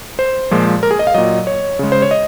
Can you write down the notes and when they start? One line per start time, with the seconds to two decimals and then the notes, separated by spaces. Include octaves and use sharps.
0.19 C5
0.51 A#2 F3 G#3
0.83 A#4
0.91 G#4
0.99 D#5
1.07 F5
1.14 A#2 F#3 D#5
1.47 C#5
1.79 C#3 G#3
1.92 C5
2.02 C#5
2.11 D#5